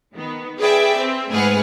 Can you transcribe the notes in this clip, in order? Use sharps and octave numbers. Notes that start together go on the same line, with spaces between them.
D#3 B3
G#4 B4 D5 E5 G5
C4
G#2 A3 G#4 B4 F#5 F6